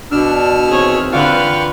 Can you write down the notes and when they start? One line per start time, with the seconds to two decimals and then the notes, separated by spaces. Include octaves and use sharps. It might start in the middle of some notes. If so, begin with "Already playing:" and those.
0.11 B2 D4 E6 F6
0.69 D#3 E3 C4 G#4 C#5
1.13 D3 F4 B4 F5 G5 C#6